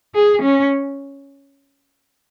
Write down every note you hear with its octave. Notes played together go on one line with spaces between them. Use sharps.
G#4
C#4